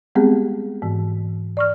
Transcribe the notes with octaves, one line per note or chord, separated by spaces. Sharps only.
G3 G#3 B3 C4 G4 G#4
G#2 E3
D5 C#6 F6